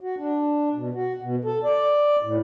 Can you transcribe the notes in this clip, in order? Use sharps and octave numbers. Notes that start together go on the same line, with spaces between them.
F#4
D4
B2
F#4
B2
A4
D5
A2